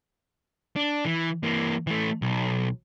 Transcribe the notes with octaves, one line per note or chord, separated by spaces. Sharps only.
D4
E3
E3 A#3
E3 A3
B1